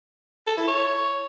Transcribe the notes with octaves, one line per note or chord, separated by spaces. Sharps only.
A4
E4
C#5